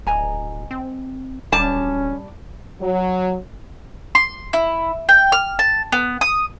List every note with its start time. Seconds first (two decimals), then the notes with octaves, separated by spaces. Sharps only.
0.07 D1 D#5 G#5 A#5
0.71 C4
1.52 D1 G3 C#4 A5
2.81 F#3
4.15 C6
4.53 E4
5.09 G5
5.32 F6
5.59 A5
5.92 B3
6.21 D#6